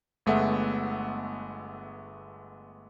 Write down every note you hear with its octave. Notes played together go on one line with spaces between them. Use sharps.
G1 G#3 A3 B3 E5 F#5